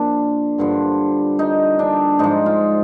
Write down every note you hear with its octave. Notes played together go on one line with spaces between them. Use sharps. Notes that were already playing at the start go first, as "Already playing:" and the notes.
Already playing: A#2 F3 D4
G2 D3 F3
D#4
D4
G#2 F3 D#4
F4